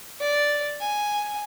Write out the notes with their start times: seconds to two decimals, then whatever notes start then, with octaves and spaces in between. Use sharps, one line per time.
0.21 D5
0.81 G#5